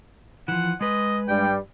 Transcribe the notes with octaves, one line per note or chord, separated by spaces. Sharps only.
E3 F3 F#5
G#3 B4 D#5
G2 G3 G5